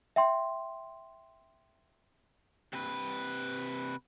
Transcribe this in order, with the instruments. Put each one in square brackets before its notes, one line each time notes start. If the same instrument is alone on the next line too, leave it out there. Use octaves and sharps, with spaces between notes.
[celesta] E5 G5 C6
[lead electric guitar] C3 B4